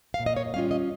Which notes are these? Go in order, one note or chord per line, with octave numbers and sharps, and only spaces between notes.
F5
A#2
D#5
C#5
G3 C#4 F4 F5
D#5